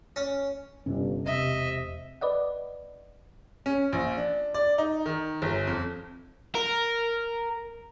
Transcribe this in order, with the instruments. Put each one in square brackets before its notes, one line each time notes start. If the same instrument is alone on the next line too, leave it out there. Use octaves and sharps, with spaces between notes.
[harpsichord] C#4
[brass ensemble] G1 [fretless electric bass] G2 C3 C#4
[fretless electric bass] E1 [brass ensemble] C3 [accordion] D#5 [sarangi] E5
[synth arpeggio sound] B4 D5 D#5 F#5
[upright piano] C#4
A#1
D4
D5
D#4
D#3
G1
F2
[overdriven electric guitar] A#4